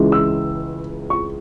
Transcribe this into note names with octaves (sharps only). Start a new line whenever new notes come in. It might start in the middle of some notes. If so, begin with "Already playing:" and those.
Already playing: C#2 C#3 E3 G#3
E6
C#6